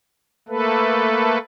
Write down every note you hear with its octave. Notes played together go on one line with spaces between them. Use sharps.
A3 A#3 A4 B4